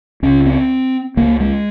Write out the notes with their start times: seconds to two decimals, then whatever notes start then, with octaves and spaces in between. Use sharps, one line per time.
0.22 C#2 C#3 C#4
0.46 C4
1.17 C#2 C#3 A#3
1.40 G#3